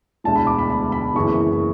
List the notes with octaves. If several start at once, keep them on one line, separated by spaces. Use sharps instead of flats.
E1 D2 D3 G#3 A5
B5
D6
B5
B5
B5
F#1 F#2 C#3 E3 C#6